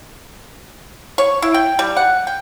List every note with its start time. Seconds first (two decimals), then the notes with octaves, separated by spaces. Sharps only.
1.18 C#5
1.42 E4
1.54 G5
1.79 G3
1.97 F#5
2.27 G5